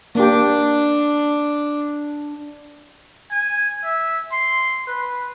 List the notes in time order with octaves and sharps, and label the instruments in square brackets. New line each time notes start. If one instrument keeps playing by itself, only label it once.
[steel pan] A#3 G4 [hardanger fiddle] D4
[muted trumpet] G#5
E5
C6
B4